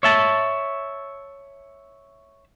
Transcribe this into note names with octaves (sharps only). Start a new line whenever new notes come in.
C#5 E5 A5